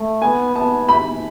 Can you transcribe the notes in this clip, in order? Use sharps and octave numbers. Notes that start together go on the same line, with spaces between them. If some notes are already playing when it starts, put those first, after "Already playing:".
Already playing: A3
B3 G#5
B3 A5
B5